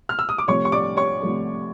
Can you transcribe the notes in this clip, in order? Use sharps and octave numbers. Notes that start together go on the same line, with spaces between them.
F6
E6
D#6
D6
C3 F3 A3 C#5 C#6
C#6
D5 D6
C#5 C#6
C3 F3 A3